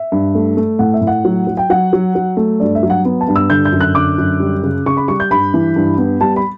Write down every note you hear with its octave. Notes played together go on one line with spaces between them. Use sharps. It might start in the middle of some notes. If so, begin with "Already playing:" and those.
Already playing: E5
G2
A3
A3
A2 F#5
E5
A2
F#5
F#3
F#3
G5
F#3 F#5
F#3
F#3
A3
G2 D5
E5
F#3
F#5
B3
A5
G2
E6
D3 G6
G6
F#2
F#6
D3 D6
F#2
G3
C#3
C#3 C#6
B5
G3 C#6
G6
G2 B5
E3
G2
B3
G3 A5
B5